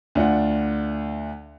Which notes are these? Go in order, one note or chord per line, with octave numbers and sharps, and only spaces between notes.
D2 D4 F4 F#5